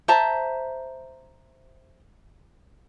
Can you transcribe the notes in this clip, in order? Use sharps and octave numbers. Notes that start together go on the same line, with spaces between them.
C5 E5 A5 A#5